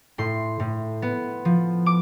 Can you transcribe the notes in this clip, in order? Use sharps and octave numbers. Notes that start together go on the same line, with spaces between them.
A2 C6
A2
B3
F3
D6